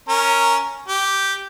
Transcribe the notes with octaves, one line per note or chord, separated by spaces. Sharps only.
C#4 A#4
G4